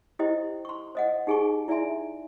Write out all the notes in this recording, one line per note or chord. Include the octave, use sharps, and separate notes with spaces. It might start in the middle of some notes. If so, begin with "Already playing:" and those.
E4 G4 C5 D#5 G5
C6 C#6
C5 D#5 F#5
D#4 G4 G#4 G#5 A5 C#6
E4 D5 E5 G#5 C6